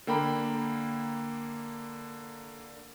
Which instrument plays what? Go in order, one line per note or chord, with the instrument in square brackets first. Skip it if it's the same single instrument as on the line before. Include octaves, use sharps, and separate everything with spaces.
[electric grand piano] D3 A#3 G5 A#5 B5